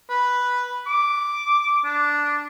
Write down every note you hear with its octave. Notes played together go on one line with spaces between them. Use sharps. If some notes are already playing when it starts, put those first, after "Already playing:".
B4
D6
D4